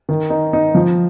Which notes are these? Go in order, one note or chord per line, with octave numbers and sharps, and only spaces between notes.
D#3
D#4
D#4
F3